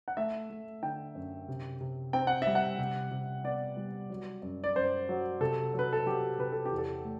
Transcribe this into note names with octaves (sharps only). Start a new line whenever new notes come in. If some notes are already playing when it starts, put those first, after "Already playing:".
F#5
A3 E5
A3
D3 G5
F#2
C3
C3
C4 G5
F#5
G3 E5
F#5
C3
C3
B3 D5
G3
F#3
F#2
D5
F#2 C5
F#3
C3 A4
F#3 B4
A4
F#3 G4
C3 B4
A4
G4
E2
A4
A3